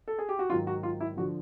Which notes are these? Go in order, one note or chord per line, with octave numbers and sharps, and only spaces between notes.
A4
G#4
G4
F#4
G#2 D#3 F#3 F4
F#4
F4
E4
D3 F3 F#4